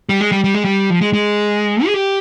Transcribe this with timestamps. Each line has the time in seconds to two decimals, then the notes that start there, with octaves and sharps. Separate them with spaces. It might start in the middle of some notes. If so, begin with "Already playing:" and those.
0.09 G3
0.21 G#3
0.32 G3
0.44 G3
0.54 G#3
0.65 G3
0.90 F3
1.01 G#3
1.13 G#3
1.86 G#4
1.94 G4